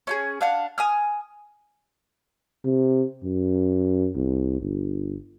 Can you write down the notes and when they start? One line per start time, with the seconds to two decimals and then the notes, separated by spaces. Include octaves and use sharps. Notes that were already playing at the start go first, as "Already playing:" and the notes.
0.07 C#4 F4 G#4
0.41 D4 F5 F#5
0.78 G#5 D#6 F6
2.65 C3
3.23 F#2
4.15 C2
4.61 G1